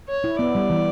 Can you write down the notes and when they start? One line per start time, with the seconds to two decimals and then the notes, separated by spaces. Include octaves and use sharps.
0.09 C#5
0.24 E4
0.39 B3 D5
0.55 G3
0.70 E3